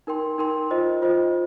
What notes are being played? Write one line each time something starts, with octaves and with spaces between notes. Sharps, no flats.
D#4 A#4 G5 C6
D#4 A#4 G5 C6
F4 C5 D#5
F4 C5 D#5